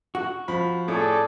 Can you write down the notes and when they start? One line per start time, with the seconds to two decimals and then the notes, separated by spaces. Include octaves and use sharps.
0.15 F#4
0.48 F3 B5
0.88 A2 G#4 A4 D5